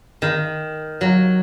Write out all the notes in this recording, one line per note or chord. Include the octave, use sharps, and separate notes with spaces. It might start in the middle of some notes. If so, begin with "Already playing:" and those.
D#3
F#3